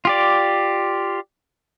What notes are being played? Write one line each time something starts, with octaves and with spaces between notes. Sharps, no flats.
F4 G4 D5